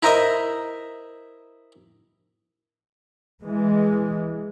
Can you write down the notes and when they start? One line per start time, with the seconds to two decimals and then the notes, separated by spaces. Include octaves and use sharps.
0.03 E4 A#4 C5 D#5 E5
3.44 E3 G#3